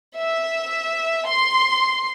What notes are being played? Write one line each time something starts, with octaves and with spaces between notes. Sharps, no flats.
E5
C6